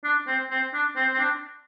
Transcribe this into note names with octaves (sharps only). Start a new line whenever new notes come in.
D4
C4
C4
D4
C4
C4
D4